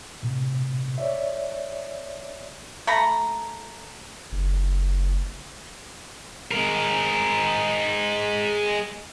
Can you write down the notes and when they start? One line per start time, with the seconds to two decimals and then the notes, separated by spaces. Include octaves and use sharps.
0.23 A2 C3
0.98 C#5 D5 E5
2.87 A3 A#5 B5
4.32 F#1
6.51 G#3 A#4